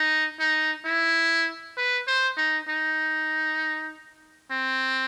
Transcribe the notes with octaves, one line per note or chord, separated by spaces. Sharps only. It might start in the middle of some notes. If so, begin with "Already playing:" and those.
Already playing: D#4
D#4
E4
B4
C5
D#4
D#4
C4